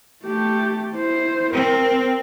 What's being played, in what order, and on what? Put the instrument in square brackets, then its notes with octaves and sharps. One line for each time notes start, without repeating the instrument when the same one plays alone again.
[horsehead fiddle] A3 G4
E4 C5
[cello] C4 [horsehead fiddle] A#4